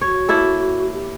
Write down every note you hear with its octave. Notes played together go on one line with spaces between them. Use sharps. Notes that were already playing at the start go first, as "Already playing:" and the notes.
F#4 C#5
A#3 E4 A4
G4